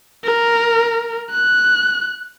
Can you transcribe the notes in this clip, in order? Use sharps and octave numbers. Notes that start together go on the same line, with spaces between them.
A#4
F#6